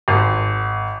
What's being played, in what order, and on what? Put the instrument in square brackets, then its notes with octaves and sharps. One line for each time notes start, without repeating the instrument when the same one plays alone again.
[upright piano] G#1